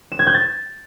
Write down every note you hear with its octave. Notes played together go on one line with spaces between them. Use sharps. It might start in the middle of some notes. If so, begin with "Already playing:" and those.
E7
G#6
G6
A6